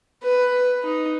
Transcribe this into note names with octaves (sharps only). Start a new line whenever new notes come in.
B4
D#4